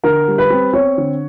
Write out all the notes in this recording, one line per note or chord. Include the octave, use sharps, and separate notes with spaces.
D3 A#4
G3
B4
C4
C4 C#5
D3